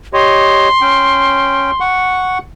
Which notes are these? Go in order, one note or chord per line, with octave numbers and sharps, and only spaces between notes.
G4 C#5 D#5 C6
C#4 G5
F#5 C#6